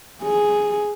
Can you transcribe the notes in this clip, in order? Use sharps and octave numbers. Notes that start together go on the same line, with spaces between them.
G#4